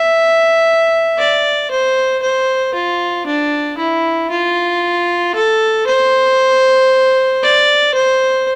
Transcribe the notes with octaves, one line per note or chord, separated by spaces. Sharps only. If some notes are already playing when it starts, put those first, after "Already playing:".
Already playing: E5
D5
C5
C5
F4
D4
E4
F4
A4
C5
D5
C5